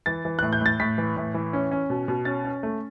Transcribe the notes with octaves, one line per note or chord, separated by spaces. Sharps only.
E3 A6
E3
A2 F#6
G6
A2 A6
A2 B6
E3
A2
E3
C#4
C#4
B2
B2
C#4 A6
C#4
A3